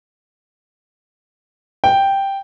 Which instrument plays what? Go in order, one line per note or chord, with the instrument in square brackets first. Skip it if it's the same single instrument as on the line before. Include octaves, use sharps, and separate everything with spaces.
[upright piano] G5